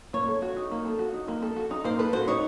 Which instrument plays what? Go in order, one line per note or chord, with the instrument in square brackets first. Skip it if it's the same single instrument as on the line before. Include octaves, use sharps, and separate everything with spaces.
[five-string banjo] A#3 [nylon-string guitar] C#5
[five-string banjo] A4
F#4
D#4
A#3
A4
F#4
D#4
A#3
A4
F#4
D#4
[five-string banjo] A#3 [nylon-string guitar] C5
[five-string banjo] A4 [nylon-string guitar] B4
[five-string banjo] F#4 [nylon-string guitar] C5
[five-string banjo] D#4 [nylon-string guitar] C#5